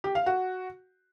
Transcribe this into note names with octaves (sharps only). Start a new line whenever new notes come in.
G4
F5
F#4